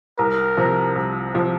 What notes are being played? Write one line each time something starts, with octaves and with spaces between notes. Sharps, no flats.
C2 A#4
C3 F3
C2
C3 F3